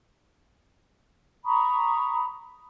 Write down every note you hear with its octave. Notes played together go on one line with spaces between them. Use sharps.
A#5 B5 C#6 D#6